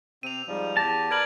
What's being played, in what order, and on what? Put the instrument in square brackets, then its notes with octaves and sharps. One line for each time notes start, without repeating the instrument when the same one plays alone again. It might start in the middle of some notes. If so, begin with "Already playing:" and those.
[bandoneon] C3 C4 [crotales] D#7 F7
[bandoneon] G#2 F3 G3
[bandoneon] E2 G4 [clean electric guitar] A5 [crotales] A#6
[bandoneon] A#4 B4 D5 [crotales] G#6 D7 F#7